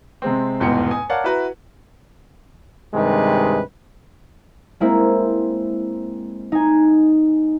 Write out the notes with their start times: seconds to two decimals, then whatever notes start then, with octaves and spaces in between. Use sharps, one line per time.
0.22 C3 G#3 C4
0.60 F1 E2 G#2 B2 G5 C#7
0.91 G#5 D#6
1.09 A#4 C#5 D5 F5 F#5 A5
1.24 E4 F#4 B4 A#5
2.94 G2 C3 D#3 G#3 B4
4.80 G#3 A#3 C4 E4
6.52 D#4 G#5